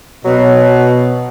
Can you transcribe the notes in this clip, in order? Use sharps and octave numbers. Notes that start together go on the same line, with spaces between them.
B2 F#3